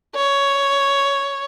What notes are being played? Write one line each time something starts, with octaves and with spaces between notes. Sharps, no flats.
C#5